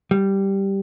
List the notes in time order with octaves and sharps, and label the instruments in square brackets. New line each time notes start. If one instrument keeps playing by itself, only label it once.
[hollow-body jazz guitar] G3